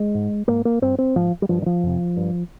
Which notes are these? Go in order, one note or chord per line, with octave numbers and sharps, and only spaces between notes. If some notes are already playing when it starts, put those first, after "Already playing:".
Already playing: G#3
G#2
G#2 A#3
A#3
G2 C4
C4
G#2 F3
G3
G2 F3
D#3
F3
F2 C3
G2